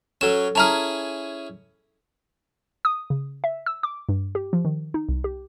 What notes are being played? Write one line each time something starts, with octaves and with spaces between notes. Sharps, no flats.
F#3 C#4 A4 E7
C#4 E4 G#4 A5 A#5 F6
D#6
C#3
E5
E6
D6
G2
G4
F3
D#3
D#4
C2
G4